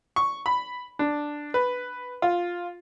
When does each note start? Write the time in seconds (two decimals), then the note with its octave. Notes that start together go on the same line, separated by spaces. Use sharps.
0.16 C#6
0.46 B5
0.99 D4
1.54 B4
2.22 F4